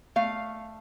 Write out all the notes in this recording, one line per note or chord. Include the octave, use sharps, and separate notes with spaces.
A3 F5